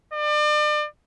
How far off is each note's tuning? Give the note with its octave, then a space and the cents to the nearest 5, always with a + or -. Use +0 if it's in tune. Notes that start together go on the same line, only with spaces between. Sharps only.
D5 +35